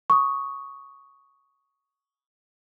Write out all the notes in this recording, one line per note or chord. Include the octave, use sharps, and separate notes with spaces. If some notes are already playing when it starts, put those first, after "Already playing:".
C#6 D#6